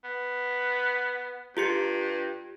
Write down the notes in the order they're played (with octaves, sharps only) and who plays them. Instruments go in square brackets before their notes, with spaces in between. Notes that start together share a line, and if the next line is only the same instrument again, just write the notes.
[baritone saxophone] B3
[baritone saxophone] G2 [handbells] F4 G4 C#7